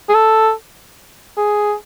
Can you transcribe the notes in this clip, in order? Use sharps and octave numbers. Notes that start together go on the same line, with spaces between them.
G#4
A4
G#4